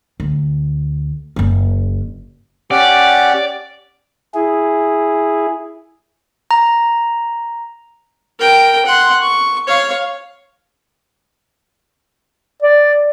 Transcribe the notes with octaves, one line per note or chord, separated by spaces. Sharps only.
D2
F#1 C#4
C#4 G4 D5 F#5
E4 G#4
A#5
A#4 G5
F#5 C6
C#6
C#5 F5
D5